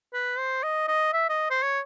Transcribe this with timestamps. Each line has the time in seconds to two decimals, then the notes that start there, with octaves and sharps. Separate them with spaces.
0.13 B4
0.38 C5
0.63 D#5
0.88 D#5
1.13 E5
1.29 D#5
1.50 C5
1.63 C#5